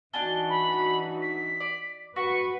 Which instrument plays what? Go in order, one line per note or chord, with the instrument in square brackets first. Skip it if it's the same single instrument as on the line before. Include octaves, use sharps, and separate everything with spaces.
[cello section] E3 D#4 F#4 [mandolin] D4 G#5 A5 [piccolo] G7
[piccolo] B5
B6
[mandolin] D5
[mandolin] F#4 [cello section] B4 [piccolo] C#6